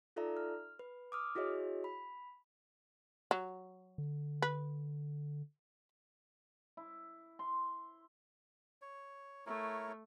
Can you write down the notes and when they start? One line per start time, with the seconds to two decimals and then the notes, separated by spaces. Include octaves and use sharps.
0.16 D#4 F4 A4 D5 E5 A#5
0.37 F6
0.79 B4
1.12 D6 D#6 F6
1.35 E4 F#4 G#4 C#5 D#5 E5
1.84 B5
3.31 F#3
3.98 D3
4.42 B4
6.77 E4
7.39 C6
8.82 C#5
9.46 A3 E4 A#4 C#5